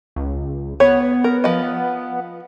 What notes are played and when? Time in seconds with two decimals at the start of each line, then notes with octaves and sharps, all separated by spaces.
0.16 C#2
0.80 B3 C#5
1.24 A#4
1.44 F3 D#5